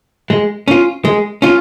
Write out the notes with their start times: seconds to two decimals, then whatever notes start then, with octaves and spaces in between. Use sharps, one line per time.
0.30 G#3
0.68 C#4 F4
1.05 G#3
1.42 C#4 F4